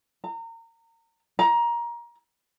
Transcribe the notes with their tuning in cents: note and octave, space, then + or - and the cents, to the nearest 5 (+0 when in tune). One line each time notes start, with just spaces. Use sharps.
A#5 -30
A#5 +20